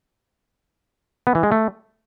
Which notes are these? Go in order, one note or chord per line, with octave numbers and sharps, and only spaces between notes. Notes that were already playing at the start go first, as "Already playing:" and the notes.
B3
E3
G#3
A3